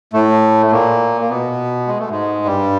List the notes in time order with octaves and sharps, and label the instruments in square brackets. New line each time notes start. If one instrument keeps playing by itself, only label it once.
[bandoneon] A2 A3
A3
A#2 A#3
A#3
B2 B3
G#3
A3
G#2 G#3
G2 G3